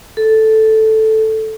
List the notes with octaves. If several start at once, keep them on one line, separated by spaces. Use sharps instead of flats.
A4